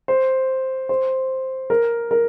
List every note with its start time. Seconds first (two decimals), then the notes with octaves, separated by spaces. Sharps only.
0.08 C5
0.89 C5
1.70 A#4
2.11 A#4